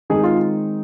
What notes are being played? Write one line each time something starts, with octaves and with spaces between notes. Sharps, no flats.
D#3 G#3 C4 D#4 G#4
F4